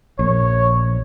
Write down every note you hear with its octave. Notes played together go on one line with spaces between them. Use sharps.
A#1 C#5